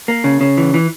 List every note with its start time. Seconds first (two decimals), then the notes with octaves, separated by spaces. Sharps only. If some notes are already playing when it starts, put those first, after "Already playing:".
0.08 A#3
0.24 C#3
0.41 C#3
0.58 E3
0.74 E3